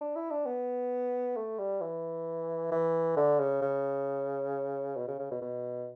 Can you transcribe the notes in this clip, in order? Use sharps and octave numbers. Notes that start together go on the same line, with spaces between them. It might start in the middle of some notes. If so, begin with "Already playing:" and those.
D4
E4
D4
B3
A3
G3
E3
E3
D3
C#3
C#3
B2
C#3
C#3
B2
B2